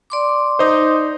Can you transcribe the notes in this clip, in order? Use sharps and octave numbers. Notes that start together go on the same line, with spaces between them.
D5 C6 D6
D#4 C5